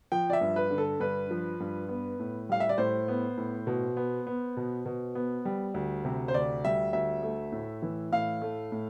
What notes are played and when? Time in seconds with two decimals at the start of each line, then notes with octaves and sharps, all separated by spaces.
0.12 F3 G5
0.30 D5
0.33 E5
0.41 G2
0.56 B4
0.71 D3
0.78 A4
1.00 G2 B4
1.31 F3
1.60 G2
1.89 B3
2.20 A2
2.49 G3 F5
2.60 E5
2.69 D5
2.78 A2 C5
3.08 B3
3.38 A2
3.67 B2
3.97 B3
4.27 B3
4.57 B2
4.86 B2
5.15 B3
5.45 G3
5.74 D2
6.05 C3
6.28 C5
6.34 D2 D5
6.65 G3 E5
6.93 D2 E5
7.23 A3
7.52 A2
7.82 E3
8.12 A2 F5
8.42 A3
8.72 A2